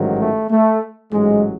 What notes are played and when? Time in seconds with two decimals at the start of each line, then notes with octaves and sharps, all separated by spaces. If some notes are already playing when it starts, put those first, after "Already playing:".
Already playing: A1 G#2 D#3 F#3
0.18 A3
0.49 A3
1.11 A1 G#2 F#3 G#3